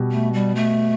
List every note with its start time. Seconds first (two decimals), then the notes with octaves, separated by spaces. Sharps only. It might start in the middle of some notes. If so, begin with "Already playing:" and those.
Already playing: B2 G3
0.12 A3
0.33 G3
0.56 A3